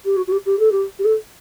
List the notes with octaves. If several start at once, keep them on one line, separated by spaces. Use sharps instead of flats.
G4
F#4
F#4
G4
G4
A4
G4
G4
A4